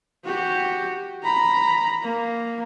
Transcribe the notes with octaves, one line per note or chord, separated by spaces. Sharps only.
F#4 G4
A#5 B5
A#3